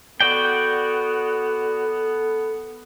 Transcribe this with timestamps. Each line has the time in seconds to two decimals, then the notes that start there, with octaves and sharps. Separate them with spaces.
0.20 B3 F#4 A4 D5 G5